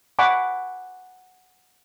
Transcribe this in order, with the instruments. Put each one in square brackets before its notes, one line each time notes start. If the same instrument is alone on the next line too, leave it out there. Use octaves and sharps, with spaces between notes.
[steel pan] D5 F#5 G#5 B5 C#6 D6